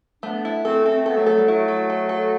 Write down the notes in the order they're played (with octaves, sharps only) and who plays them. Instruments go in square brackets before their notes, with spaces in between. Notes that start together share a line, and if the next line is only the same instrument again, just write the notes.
[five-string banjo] A3 [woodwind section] B3 D4
[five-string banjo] E4
[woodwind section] A3 C4 [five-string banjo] A4
[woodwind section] A3 C4 [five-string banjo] A4
[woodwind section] B3 [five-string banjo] A4
[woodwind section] F#3 A3
[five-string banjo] A4
[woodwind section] G3
[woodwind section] F#3 A3 [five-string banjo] E4
[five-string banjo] A4
A4
A4